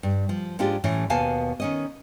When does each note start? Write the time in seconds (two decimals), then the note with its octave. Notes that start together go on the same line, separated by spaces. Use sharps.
0.03 G2
0.29 F3
0.59 G#2 G#3 D4 F4 G4
0.84 A2 E3 A3 C#4
1.10 D#2 B2 B4 F5 G#5 A5
1.60 D#3 C#4 D#5